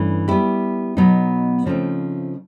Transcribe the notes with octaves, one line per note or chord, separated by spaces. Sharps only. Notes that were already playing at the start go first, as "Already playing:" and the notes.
Already playing: G2 E3 A3 C#4
G3 B3 E4 G4
B2 F#3 B3 D#4
C#3 F3 A3 C4 D#4